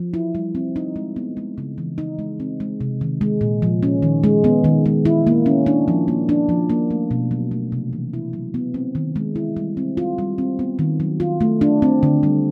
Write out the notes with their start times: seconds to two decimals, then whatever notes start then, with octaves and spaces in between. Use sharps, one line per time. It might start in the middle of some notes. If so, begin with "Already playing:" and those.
Already playing: F3
0.14 E4
0.35 G3
0.55 C4
0.76 D#4
0.96 G#3
1.16 B3
1.37 G#3
1.58 C#3
1.78 E3
1.98 D#4
2.19 G#3
2.40 C4
2.60 G#3
2.81 C3
3.01 D#3
3.21 G#3
3.41 A#2
3.62 F3
3.83 C#4
4.02 D#3
4.24 G#3
4.44 B3
4.64 D#3
4.86 G#3
5.05 E4
5.27 A#3
5.46 C#4
5.66 D4
5.88 F3
6.08 A#3
6.29 D4
6.49 F3
6.70 A#3
6.91 A3
7.11 B2
7.31 F#3
7.51 A3
7.72 C3
7.93 E3
8.14 E4
8.33 F#3
8.54 B3
8.74 C4
8.95 D#3
9.16 G#3
9.36 E4
9.57 G3
9.77 C4
9.97 F4
10.18 G3
10.38 C4
10.59 B3
10.79 D#3
11.00 F#3
11.20 F4
11.41 A3
11.61 D4
11.82 C4
12.03 D3
12.23 G3